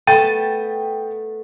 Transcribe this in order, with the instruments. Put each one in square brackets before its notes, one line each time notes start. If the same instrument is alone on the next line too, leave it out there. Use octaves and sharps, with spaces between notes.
[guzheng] A3 B3 A5 [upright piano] G5 A6 D#7